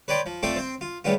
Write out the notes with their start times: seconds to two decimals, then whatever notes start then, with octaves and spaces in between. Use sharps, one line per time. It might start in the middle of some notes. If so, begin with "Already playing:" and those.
0.08 B4 C#5 D5 G5 C6
0.26 F3
0.43 A3 C4 F4 A4 D5 G5
0.56 C4 C5
0.81 F4
1.04 A2 C#3 G3 B3 F4